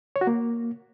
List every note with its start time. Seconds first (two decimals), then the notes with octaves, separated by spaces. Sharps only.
0.16 C#5
0.21 F#4
0.27 A#3